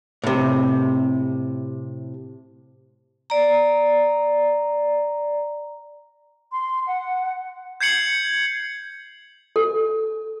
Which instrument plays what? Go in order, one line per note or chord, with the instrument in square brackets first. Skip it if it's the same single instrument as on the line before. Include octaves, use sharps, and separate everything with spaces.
[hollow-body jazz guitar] A2 C3
[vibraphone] D5 A#5
[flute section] C6
F#5
[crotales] G6 G#6 C7 C#7 F#7
[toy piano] A4